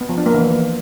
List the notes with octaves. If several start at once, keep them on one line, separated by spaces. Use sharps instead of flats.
B3
F3
D4
A#3
E3